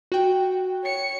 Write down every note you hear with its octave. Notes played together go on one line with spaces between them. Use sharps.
F#4 G5
C#5 C#7